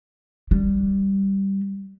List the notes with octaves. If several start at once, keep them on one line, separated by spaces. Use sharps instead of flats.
G3